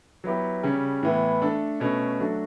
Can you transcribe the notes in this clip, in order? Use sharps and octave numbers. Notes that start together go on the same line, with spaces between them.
F#3 B3 E4 G4
C#3 G3 C#4
A2 E3 B3 E4
A3 D4 A4
B2 A3 C#4
F#3 A3 D4 F#4 A4